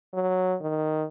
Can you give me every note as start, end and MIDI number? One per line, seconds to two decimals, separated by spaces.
0.14 0.56 54
0.61 1.05 51